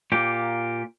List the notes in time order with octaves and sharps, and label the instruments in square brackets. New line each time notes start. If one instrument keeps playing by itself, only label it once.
[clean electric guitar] A#2 A#3 G4